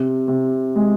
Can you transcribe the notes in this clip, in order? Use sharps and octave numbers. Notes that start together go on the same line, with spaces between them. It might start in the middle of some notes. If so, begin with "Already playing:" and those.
Already playing: C3
C3
G#3